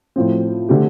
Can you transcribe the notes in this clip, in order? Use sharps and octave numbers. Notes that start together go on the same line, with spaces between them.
A2 F3 C4
D3 A3 C4 G4